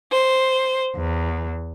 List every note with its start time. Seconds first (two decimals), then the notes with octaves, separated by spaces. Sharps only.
0.11 C5
0.95 E2